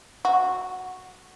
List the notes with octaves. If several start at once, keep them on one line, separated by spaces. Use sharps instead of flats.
F#4